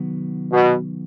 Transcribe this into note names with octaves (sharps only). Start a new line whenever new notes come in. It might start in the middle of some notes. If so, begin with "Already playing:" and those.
Already playing: C3 D#3 F#3 B3
B2